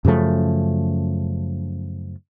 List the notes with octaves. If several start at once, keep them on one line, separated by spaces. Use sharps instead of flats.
F#2 C#3 F3 A3